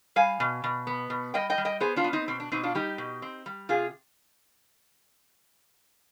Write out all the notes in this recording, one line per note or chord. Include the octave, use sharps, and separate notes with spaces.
G3 F5 G#5
B2
B2
B3
B2
G3 D#5 G5
D#5 G5
G3
D#5 G5
B3 G#4 C5
D4 F4
B3
C4 D#4
B2 C4
D4
B2 C4 D#4
D4 F4
G3 D#4 G4
B2
C4
G3
C3 F4 G#4